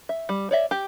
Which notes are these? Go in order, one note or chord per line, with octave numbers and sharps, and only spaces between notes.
E5
G3
C#5 D5 E5
G4